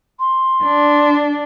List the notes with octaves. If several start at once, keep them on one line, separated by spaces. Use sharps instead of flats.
C6
D4